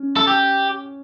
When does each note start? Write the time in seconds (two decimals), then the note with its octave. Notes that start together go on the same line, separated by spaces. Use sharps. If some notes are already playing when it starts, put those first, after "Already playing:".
Already playing: C#4
0.16 A4
0.27 G4